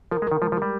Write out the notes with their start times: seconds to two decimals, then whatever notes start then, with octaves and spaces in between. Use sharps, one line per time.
0.11 F3 A#4
0.22 G#3
0.27 D#3 A#4
0.42 F3 G#3
0.52 F3
0.57 G3 G4